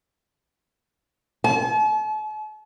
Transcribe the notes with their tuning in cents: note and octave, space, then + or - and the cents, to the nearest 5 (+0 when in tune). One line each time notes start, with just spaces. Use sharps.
A5 -45